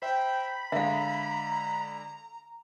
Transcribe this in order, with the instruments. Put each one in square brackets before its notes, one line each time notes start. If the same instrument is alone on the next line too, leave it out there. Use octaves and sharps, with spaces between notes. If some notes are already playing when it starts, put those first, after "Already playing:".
[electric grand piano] C5 E5 [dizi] G5 [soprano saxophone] B5
[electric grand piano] D3 G#3 [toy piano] E5 F5 [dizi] A#5